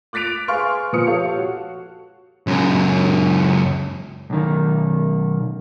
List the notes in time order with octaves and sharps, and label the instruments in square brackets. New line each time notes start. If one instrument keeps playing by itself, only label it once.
[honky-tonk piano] D6 F#6 A6 B6 D7 F7
G#4 B4 F5 C6 C#6 F6
A#2 F3 B3 F4 D#6 C#7
F4 G4 A4 C#5 F5
F#4
[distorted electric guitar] C#2 F#2
[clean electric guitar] B1 D#3